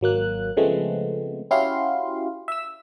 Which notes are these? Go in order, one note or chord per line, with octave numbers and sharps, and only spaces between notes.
G#1 F#3 A#3 F#6
C#3 F3 G#3 A3 B3 C4
C#4 E4 F#4 G4 F5 C6
E5 E6